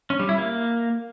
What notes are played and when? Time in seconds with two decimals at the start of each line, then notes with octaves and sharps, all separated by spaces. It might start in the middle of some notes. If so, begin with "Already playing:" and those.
0.10 C#4
0.19 G3
0.29 E4
0.38 A#3